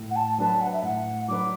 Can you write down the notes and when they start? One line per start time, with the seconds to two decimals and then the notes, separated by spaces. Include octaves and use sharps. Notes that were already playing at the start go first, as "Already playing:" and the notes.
Already playing: A2
0.10 F#5
0.16 A5
0.38 F#3 D4 B4 A5
0.61 F#5
0.73 E5
0.83 A2 F#5
1.28 F#3 D4 B4 D6